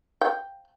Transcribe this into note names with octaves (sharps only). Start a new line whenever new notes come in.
G5